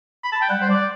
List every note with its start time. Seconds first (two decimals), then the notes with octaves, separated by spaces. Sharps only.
0.24 B5
0.32 A5
0.42 G5
0.50 G3 F#5
0.62 C5
0.70 D5